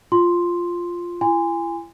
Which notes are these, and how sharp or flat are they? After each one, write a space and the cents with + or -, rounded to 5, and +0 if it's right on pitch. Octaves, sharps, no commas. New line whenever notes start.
F4 +0 C6 +0
E4 +40 G#5 -25 C6 -25